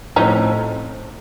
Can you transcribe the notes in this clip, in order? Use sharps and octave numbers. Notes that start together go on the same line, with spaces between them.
A2 F3 A3 C4 C#4 D#4